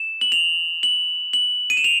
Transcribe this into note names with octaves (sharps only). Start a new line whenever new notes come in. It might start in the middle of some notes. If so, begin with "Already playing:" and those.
Already playing: E7
F#7
F7
F#7
F#7
D#7
E7
F7